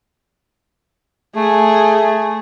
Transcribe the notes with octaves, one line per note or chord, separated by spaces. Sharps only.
A3 G#4